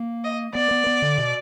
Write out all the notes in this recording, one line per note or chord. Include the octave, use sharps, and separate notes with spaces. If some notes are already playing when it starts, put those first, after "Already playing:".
Already playing: A#3
D#5
B3 D5
B3
B3
D3
B2